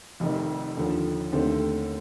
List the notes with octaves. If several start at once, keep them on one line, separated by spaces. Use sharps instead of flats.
F1 F2 C3 D#3
D#2 D3 F3
D#2 D3 A3 C4